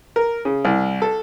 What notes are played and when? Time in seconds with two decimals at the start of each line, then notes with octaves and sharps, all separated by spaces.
0.16 A#4
0.45 C#3
0.65 C2
1.02 A4